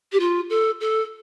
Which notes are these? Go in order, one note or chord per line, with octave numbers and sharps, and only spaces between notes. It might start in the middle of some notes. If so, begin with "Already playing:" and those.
G4
F4
A4
A4